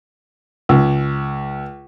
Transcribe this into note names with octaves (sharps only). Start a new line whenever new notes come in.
C#2